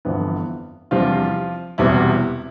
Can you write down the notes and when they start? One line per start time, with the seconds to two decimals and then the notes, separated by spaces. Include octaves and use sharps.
0.05 G1 F2 E3 B3 D4
0.91 E2 C3 F3 G3 D4 F4
1.78 E1 E2 C3 G3 B3 E4